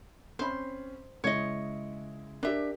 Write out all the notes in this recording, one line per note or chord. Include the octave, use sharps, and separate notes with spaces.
C4 C#4 C5 B5
C#3 G#3 E4 C#5 D#5
D4 G4 A#4 E5